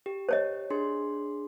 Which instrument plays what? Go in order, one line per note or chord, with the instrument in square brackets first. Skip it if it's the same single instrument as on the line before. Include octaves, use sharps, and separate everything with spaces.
[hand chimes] G4
[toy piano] C5 C#5 D#5
[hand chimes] D4 G#4 C6